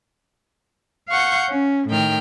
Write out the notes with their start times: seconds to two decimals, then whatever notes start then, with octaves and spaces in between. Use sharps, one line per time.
1.09 F5 F#5 C#6 G6
1.50 C#4
1.87 A2 D#3 G5 F6